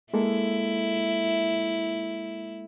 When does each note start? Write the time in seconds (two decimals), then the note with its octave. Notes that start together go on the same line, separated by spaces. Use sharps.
0.14 G#3 A#3 E4 A4